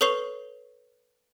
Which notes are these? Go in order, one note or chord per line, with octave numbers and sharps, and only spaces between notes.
A4 B4 C#5 C#6 C7 F7